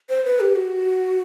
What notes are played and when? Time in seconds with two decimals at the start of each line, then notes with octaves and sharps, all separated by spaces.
0.09 C5
0.25 B4
0.40 G4
0.56 F#4